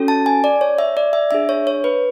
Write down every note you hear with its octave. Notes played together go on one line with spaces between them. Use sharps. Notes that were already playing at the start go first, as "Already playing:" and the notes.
Already playing: C#4 F#4 A4
A5
G#5
D5
C#5
E5
D5
E5
D4 G#4 E5
C#5
C#5
B4